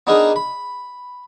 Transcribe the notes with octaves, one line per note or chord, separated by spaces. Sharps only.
B3 D4 D#4 G#4 A#4 B4
B5